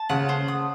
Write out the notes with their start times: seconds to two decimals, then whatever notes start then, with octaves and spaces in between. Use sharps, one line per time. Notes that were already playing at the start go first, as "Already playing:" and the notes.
Already playing: A5
0.09 C#3 F#5
0.29 C5
0.48 D#6